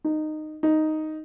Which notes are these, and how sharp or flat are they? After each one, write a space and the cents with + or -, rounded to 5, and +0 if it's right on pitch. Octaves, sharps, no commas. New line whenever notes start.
D#4 -15
D#4 +0